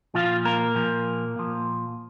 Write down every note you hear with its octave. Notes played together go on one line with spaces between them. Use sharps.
A#2 F3 F4 F5
A#3 A#4
A#2 F3
A#2 F3